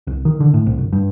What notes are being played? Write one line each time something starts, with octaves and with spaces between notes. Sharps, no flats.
C2
D#3
D3
A2
C2
G1
G2